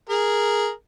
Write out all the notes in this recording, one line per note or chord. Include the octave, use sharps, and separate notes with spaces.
G#4 A#4